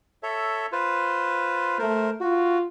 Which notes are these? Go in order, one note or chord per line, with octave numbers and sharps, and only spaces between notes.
A4 C#5 E5
F4 B4 C5
A3 A#4 C5
F4 F#4